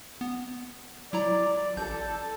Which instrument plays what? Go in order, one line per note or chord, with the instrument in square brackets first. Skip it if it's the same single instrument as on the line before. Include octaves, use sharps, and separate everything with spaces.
[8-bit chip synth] B3
[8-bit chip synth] F#3 E4 A#5 [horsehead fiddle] D5
[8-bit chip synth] A1 G6 [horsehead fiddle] A4